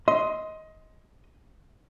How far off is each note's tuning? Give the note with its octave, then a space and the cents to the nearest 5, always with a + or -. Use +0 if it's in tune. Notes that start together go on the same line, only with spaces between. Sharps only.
D#5 +20 C6 +0